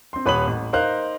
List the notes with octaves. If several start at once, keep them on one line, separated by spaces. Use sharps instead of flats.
C4 C6
D#1 B4 C#5 B5 D#6 F#7
A1
D#4 A#4 C5 F5 F#6